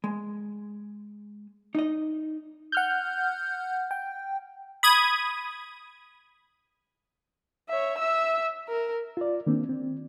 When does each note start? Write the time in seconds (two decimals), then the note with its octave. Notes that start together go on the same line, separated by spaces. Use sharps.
0.04 G#3
1.75 D#4 D#5
2.72 F#5 F6 G6
3.91 G5
4.83 B5 D#6 G#6
7.69 C#5 E5
7.98 E5 E6
8.68 A#4
9.17 F4 D5
9.47 D#3 A#3 C4 D4
9.69 C4